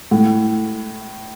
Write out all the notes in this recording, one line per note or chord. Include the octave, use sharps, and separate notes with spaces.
A2